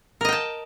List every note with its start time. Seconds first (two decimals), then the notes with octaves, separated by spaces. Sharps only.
0.21 A#4
0.25 D#5
0.29 G5
0.33 A5